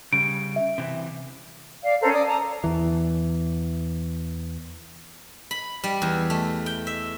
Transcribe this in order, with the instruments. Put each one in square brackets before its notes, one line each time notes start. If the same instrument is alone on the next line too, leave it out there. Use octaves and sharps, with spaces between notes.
[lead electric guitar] C#3 G3 [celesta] D7
[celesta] E5
[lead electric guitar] C3 E3
[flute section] D5 F5
C#4 A4 A#4 C5
D5 D#6
A5 A#5
[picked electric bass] E2 E3
[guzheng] B5
G3
E2
A3
G5
E5